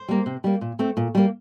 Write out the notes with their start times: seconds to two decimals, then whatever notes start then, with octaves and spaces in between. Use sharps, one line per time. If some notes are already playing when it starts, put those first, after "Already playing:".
Already playing: C5
0.08 G3 A#3
0.26 C3
0.44 G3 A#3
0.61 A#2
0.79 A3 C4
0.97 A#2
1.15 G3 A#3